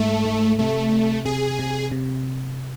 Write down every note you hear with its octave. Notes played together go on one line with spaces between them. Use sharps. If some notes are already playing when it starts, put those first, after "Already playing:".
Already playing: G#2 G#3 A3
G#2
C3 A3
C3
C3 G#4
C3
C3